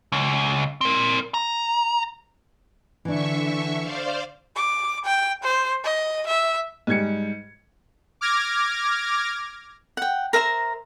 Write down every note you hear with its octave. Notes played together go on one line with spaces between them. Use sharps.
C#2
C4 A#4
A#5
D3 E3 D4 E5 C#6
C5 D5 F5
D6
G5
C5
D#5
E5
G#2 G3 G#6 C#7
D6 F6 G#6 A#6
F#5 G5
A#4 C5 E5 A#5